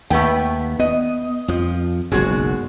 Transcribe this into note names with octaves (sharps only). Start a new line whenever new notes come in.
D#2 A3 B3 G5
B3 D#5
F2 F3
F#1 B1 F#2 G#3 F#4